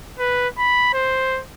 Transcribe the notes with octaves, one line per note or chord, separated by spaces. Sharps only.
B4
B5
C5